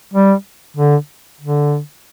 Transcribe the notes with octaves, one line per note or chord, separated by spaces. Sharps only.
G3
D3
D3